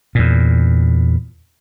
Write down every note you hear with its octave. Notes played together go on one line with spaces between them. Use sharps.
E2 A#2